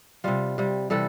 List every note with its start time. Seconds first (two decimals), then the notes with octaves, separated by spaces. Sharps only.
0.24 C3 G3 F4
0.58 C3 G3
0.90 C3 E3 G3 A4